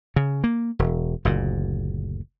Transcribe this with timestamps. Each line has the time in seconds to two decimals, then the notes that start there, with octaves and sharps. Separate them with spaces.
0.16 C#3
0.44 A#3
0.79 E1
1.25 F#1 D2 A#2